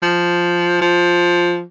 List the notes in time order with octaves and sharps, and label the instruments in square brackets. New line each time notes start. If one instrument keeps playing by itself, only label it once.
[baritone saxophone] F3
F3